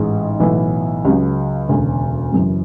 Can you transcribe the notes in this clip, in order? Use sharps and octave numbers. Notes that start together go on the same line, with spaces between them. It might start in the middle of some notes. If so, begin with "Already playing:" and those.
Already playing: A1 G#2 G#3
B1 A2 E3 B3 E4
C#2 C#3 F#3
E1 D2 C#3
F#1 F#2 E3